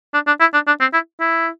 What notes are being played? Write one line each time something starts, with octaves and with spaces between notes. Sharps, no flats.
D4
D4
E4
D4
D4
C4
E4
E4